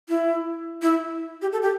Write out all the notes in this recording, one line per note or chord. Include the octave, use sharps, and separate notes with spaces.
E4
E4
G4
A4
G4